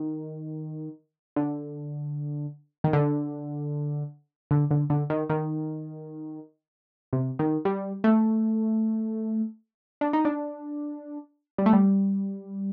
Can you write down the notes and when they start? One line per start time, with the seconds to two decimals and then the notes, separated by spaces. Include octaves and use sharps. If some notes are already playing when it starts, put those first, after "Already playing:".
Already playing: D#3
1.36 D3
2.84 D#3
2.93 D3
4.51 D3
4.71 D3
4.90 D3
5.10 D#3
5.30 D#3
7.13 C3
7.39 D#3
7.65 G3
8.04 A3
10.01 D4
10.13 D#4
10.25 D4
11.58 G3
11.66 A3
11.73 G3